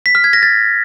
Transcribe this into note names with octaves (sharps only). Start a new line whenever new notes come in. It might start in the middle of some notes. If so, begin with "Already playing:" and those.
B6
F6
G#6
A#6
A6